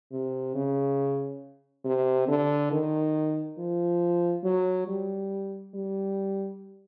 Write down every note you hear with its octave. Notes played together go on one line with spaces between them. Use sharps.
C3
C#3
C3
D3
D#3
F3
F#3
G3
G3